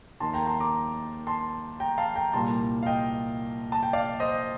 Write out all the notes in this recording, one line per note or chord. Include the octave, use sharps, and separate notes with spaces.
D#2 D#3 A#3 A5 C6
G5 A#5
A5 C6
A#5 D6
A5 C6
G5 A#5
F5 A5
G5 A#5
C2 A#2 G3 A#3 A5 C6
F5
D#5 G5
A5
G5
D5 F5
C5 D#5